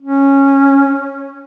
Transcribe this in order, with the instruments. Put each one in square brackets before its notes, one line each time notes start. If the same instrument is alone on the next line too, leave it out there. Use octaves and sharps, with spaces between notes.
[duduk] C#4